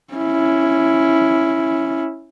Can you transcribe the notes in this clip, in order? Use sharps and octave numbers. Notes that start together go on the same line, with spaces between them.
C#4 E4